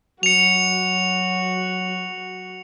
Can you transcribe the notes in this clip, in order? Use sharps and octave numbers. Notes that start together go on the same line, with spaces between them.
F#3 F#4 C#7 F7